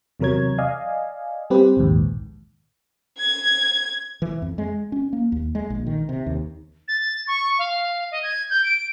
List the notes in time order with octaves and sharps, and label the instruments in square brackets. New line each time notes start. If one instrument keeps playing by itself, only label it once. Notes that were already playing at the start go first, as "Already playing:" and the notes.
[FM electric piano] E2 C3 F#3 A#4 C#5 G#6
D5 D#5 F5 G#5
G3 C4 G4 B4 C5
A#1 D#2 G#2
[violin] G#6
[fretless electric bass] E3
F2
G#3
C#4
A#3
D#2
G#3
A#1
D#3
C3
D#2
[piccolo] A6
C#6
F5
D#5
G#6
G6
D7